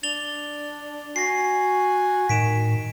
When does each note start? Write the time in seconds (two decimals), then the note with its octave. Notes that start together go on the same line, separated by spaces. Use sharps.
0.03 D4 A6 F7 G7
1.16 F#4 G#5 A#6 C7
2.29 A2 D#3 B6 D7 E7